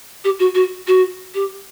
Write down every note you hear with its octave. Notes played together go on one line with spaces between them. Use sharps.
G4
F#4
F#4
F#4
G4